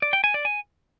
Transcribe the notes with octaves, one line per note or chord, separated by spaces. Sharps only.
D5
G5
G#5
D5
G#5